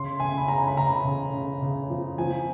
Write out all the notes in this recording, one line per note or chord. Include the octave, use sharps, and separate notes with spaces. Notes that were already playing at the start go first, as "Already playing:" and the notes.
Already playing: C#3 C6
C#3 G#5
B5
C#3 A#5
B5
C#3 A#5
C#3
C#3
C#3
F3
F3 G#5